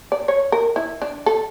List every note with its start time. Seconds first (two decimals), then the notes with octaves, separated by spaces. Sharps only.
0.12 D5
0.28 C#5
0.52 A#4
0.76 E4
1.02 D4
1.26 A4